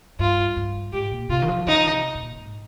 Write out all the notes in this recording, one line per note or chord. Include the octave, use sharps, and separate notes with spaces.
G2 F4
G2
G#2 G4
A#2
C3 F4
D#3
F3
D#3 D#4
F3
D#3
C3
A#2
G#2